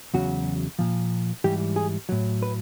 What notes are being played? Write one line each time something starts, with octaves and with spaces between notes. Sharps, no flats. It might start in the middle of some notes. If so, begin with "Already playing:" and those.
E2 C#3 F#3 F#4
A#2 F3
G#2 E3 G3 G4
G#4
A2 F#3
B4